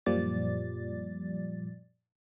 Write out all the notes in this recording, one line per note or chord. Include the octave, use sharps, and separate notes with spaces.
F#2 A#2 F3 G3 D5 A6